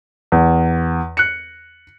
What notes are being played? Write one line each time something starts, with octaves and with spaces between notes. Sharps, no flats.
E2
F#6 C#7